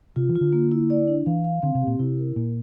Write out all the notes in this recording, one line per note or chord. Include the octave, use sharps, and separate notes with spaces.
C3 F4
E3
F4
D3
A#3
E4
D5
D4
E3 F5
F5
D3 C4
C3
G4
A#2
C3 E4
A#4
A#2 A#3